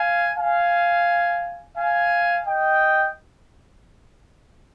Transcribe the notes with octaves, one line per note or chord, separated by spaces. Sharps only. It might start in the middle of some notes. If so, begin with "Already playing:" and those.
Already playing: F5 G#5
F5 G#5
F5 G#5
D#5 G5